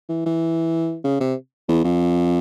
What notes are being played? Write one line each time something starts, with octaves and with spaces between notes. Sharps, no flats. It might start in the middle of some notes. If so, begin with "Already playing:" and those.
E3
E3
C#3
C3
E2
F2